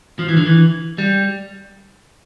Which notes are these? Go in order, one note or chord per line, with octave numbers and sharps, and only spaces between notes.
F3
E3
D3
E3
G3